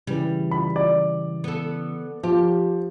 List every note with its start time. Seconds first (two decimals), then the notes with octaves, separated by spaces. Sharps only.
0.07 C#3 E3 G3
0.51 B5
0.76 D5
1.44 B3 A4
2.23 F3 G4